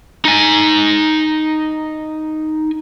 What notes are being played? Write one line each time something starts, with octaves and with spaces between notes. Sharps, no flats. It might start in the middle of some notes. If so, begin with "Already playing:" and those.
D#4 G#5